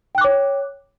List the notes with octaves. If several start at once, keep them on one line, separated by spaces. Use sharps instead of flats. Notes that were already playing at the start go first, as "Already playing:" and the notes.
C#5 G5 D6 F#6